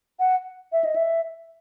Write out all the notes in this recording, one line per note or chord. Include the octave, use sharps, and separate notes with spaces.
F#5
E5
D#5
E5